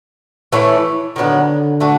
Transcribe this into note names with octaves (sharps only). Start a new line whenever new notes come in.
E3 A3 C#4 E4
D3 D#3 F#3 B3 D4
A3 D4 F#4 A4